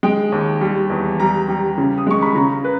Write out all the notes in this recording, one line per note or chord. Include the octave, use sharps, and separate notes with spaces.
G#3 G5
D#2
G3
E2
G3 A#5
G3
C#3
D#6
G#3 C#6
B5
C#3 A#5
B4